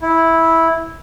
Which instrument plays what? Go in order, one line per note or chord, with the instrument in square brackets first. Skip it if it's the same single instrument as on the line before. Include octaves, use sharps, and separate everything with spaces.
[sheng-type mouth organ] E4